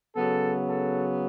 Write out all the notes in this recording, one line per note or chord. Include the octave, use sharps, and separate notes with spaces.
C#3 F#3 B3 A4
A4